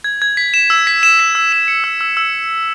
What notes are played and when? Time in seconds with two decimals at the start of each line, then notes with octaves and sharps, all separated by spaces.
0.04 G#6
0.22 G#6
0.37 B6
0.54 E7
0.70 E6
0.87 B6
1.03 E7
1.19 B6
1.35 E6
1.52 E7
1.68 C#7
1.84 E6
2.01 E6
2.17 E6